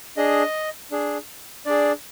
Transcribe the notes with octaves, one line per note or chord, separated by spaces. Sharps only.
D4 G#4 D#5
D4 G#4
D4 G#4 D5